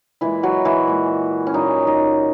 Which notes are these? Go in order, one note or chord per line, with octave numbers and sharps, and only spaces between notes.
A#2 E3 G#3 E4
F#3 F#4
E3 E4
A#2 G#3
C#4
A#2 F#3 D#4
D#4